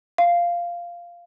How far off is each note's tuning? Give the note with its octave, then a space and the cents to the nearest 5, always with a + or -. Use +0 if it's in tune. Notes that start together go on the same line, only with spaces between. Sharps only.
F5 -5